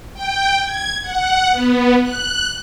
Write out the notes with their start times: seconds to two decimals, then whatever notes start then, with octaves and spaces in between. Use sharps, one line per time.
0.14 G5
0.63 G#6
1.02 F#5
1.52 B3
2.02 F#6